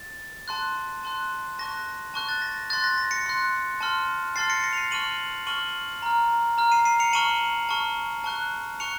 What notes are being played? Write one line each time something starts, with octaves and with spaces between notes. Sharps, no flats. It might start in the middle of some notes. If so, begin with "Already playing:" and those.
Already playing: A6
A5 C6 F#6
A5 C6 F#6
A5 C#6 F#6 A#6
A5 C#6 F#6
A6
A#6
C6 F#6 A6
A#6
A#6
A#6 C#7
C6 F#6
A5 C6 F6
A5 C6 F6 A6 C7
A#6 C#7
A#6 C#7
F7
C7 D#7
A5 C#6 F6 D#7 F#7
A5 C#6 F6 D#7 F#7
A#5 F6
A#5 F6
C7 D#7
C7 D#7
C#7 F7
A5 C#6 F6 D#7 F#7
A5 C#6 F6
A5 C#6 F#6
A5 C#6 F#6 C#7 F7